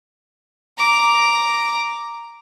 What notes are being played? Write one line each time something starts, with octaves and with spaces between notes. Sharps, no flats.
A#5 D6